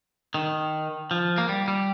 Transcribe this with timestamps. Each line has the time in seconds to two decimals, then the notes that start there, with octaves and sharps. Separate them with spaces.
0.34 D#3
1.11 F3
1.38 A#3
1.49 G3
1.68 G3